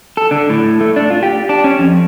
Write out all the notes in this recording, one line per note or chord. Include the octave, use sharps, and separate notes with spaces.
A4
D3
A2
A3
D4
F4
G4
D4
C#4
F2